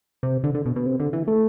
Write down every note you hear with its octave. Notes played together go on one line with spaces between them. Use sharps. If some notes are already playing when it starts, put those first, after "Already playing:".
C3
D3
D3
B2
B2
C3
D3
E3
A3